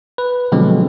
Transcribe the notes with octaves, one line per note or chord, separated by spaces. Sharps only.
B4
B2 D3 F3 F#3 G#3 C4